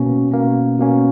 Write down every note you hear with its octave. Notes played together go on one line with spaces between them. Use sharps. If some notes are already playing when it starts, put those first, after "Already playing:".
Already playing: B2 A#3 C#4
B2 A#3 C#4
B2 A#3 C#4